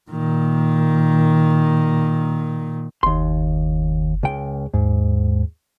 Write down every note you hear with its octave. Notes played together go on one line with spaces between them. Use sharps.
A#2 D#3
F#1 D#2 C6
C#2 G5
D#2 G#2